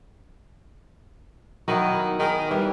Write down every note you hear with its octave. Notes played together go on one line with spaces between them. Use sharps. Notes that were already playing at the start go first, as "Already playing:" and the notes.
D#3 F#3 B3 E4
D#3 G#4
E3 G3